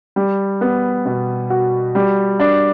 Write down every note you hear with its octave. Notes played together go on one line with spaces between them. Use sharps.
G3
B3
B2
F#4
G3
D4